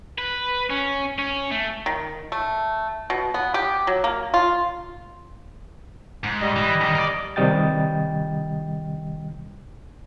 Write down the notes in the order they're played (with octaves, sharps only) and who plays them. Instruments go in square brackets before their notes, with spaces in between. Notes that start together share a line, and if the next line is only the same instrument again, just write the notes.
[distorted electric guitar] B4
C#4
C#4
A3
[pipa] D#3
A3
B2
B3
G4
F#3
A#3
F4
[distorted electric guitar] G#2
[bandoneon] G3 D#5
[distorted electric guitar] E3
D3 D#3
A#4 D5
[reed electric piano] C3 D#3 G3 D#5 G5 A6